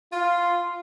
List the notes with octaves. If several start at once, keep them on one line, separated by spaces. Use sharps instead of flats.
F4